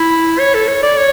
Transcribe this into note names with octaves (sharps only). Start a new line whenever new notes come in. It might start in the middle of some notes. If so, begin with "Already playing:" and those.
Already playing: E4
C#5
A4
C#5
D5
C#5